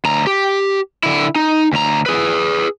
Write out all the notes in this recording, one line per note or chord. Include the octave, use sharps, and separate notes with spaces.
D2 A#5
G4
D3 E4
D#4
D2 A#5
G#4 B4